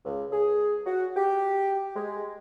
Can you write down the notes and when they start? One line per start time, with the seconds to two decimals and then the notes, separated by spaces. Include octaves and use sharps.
0.05 C#2
0.32 G#4
0.86 F#4
1.16 G4
1.95 G#3